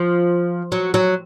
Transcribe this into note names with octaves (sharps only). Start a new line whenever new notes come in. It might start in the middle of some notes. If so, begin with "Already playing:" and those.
Already playing: F3
F#3
F#3